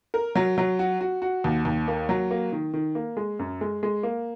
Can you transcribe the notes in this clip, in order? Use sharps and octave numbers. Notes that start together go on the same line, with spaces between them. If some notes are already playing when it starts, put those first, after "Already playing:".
A#4
F#3
F#3
F#4
F#4
F#4
D#2
D#2
A#3
F#3
A#3
D#3
D#3
A#3
G#3
F#2
G#3
G#3
A#3